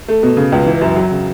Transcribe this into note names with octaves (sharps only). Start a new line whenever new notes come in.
A3
B2
C#3
C#2
E3
F#2
F#3
C#3